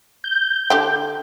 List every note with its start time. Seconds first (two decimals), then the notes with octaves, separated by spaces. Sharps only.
0.24 G6
0.70 D3 G4 G5